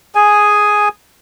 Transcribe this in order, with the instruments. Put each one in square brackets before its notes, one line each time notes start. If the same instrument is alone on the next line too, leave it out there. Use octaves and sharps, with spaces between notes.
[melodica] G#4 G#5